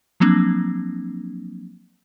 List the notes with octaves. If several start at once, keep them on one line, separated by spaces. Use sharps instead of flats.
F3 F#3 A#3 C4 D4